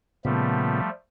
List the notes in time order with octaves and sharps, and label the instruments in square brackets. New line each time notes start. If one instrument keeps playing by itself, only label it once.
[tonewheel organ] A#2 C#3 B3 [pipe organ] F3 G3 A3